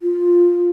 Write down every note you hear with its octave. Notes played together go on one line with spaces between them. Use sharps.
F4